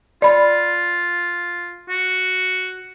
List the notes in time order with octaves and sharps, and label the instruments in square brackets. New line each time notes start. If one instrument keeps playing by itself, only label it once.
[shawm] F4 [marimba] D5 B5
[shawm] F#4